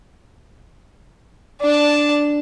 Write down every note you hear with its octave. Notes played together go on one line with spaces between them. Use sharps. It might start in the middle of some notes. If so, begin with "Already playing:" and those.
D4 A5